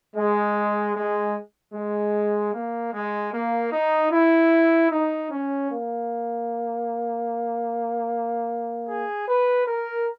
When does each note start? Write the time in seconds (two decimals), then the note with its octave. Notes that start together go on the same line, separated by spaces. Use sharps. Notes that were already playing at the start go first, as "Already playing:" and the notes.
0.16 G#3
0.95 G#3
1.74 G#3
2.54 A#3
2.93 G#3
3.34 A#3
3.72 D#4
4.12 E4
4.91 D#4
5.31 C#4
5.71 A#3
8.89 G#4
9.28 B4
9.67 A#4